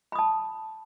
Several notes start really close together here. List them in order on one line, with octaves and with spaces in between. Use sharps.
B5 D#6 A5